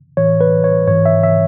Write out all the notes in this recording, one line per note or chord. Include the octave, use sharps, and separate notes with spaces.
A2 E3 C#5
B4
C#5
G#2 E3 C#5
E5
E5